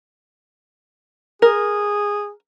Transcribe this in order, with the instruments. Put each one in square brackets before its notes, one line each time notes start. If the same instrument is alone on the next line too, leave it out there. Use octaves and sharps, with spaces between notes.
[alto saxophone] G#4 [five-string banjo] A#4